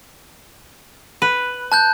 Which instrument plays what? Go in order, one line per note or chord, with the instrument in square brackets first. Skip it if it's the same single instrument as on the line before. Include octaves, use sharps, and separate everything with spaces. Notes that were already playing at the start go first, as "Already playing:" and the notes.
[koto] B4
[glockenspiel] A5 F#6 G6